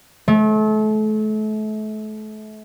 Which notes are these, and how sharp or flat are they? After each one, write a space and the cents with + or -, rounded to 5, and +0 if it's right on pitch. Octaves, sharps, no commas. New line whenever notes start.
A3 -35